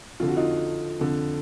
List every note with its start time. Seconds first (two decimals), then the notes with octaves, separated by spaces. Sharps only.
0.20 F2 D3 F4
0.28 F#4
0.37 D#4 F4
1.00 F2 D3